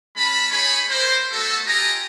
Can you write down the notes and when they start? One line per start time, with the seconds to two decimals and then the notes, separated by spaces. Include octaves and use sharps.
0.17 G#3 C#4 A5 B5
0.51 D#4 G#4 C#5 G#5 B5
0.90 A#3 C5
1.32 A3 B3 F#4 A4
1.67 F4 G4 D#5 G#5 A#5